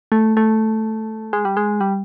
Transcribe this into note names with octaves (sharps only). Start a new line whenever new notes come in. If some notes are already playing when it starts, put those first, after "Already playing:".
A3
A3
G#3
G3
G#3
G3